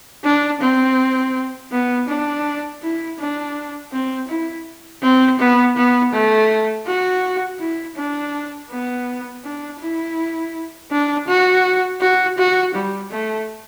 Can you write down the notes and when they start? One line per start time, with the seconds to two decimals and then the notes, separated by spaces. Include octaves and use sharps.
0.24 D4
0.61 C4
1.72 B3
2.08 D4
2.82 E4
3.19 D4
3.92 C4
4.29 E4
5.02 C4
5.39 B3
5.76 B3
6.13 A3
6.87 F#4
7.60 E4
7.96 D4
8.71 B3
9.44 D4
9.80 E4
10.91 D4
11.28 F#4
12.01 F#4
12.38 F#4
12.74 G3
13.11 A3